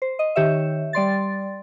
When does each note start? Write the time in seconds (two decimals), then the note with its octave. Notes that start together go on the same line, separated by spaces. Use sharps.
0.02 C5
0.19 D#5
0.36 D#3 G4 C#5 E5
0.93 G3 D5 C6 A6